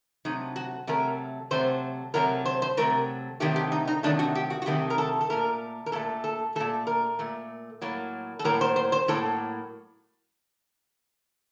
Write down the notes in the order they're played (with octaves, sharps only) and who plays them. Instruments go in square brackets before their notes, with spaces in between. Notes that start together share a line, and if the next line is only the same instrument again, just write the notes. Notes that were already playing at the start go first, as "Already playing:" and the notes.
[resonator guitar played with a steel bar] C3 F#3 A3 D#4
F#4
C3 F#3 A3 A#4
C3 F#3 A3 C5
C3 F#3 A3 A#4
C5
C5
C3 D#3 F#3 A3 A#4
C3 D#3 F#3 A3 G4
G4
D#4
D#4
C3 D#3 F#3 A3 D4
F#4
G4
F#4
F#4
C3 D#3 F#3 A3 G4
A#4
A4
A4
A#2 A3 A#4
A#4
A#2 A3 A4
A4
A#2 A3 A4
A#4
A#2 A3
A2 F#3 A#3
A4
A2 F#3 A#3 A#4
C5
C5
C5
A2 F#3 A#3 A4